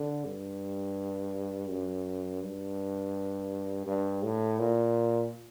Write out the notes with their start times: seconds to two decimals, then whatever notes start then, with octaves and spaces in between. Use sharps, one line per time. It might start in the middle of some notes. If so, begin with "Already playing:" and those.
Already playing: D3
0.25 G2
1.70 F#2
2.42 G2
3.87 G2
4.23 A2
4.59 A#2